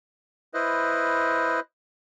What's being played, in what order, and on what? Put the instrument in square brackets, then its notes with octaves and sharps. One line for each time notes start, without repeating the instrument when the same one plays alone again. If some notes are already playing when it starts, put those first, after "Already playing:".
[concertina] E4 B4 C5 D#5